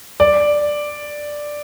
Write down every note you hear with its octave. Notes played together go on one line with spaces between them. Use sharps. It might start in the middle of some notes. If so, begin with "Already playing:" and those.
D5